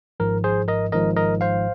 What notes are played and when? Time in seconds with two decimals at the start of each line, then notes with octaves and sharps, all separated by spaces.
0.20 G#1 G#2 F3 A#4
0.44 G#4 C5
0.68 A#4 D#5
0.92 G#1 G#2 F3 A#4 D#5
1.17 A#4 D#5
1.41 C5 F5